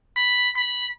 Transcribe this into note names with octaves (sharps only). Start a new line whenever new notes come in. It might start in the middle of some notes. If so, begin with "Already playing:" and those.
B5
B5